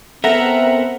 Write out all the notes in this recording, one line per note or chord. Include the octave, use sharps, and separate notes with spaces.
B3 C4 A4 A#4 E5 F#5 A#6